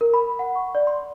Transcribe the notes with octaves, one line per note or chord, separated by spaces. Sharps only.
A#4
B5
F#5
C#6
D5
C6